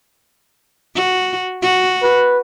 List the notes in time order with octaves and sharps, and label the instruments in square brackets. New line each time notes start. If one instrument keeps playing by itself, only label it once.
[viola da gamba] F#4
F#4
[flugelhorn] B4